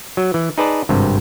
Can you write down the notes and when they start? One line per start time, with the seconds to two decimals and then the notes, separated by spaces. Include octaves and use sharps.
0.17 F#3
0.34 E3
0.58 D#4 G#4 B4 D5 A5
0.89 G#1 G2 C3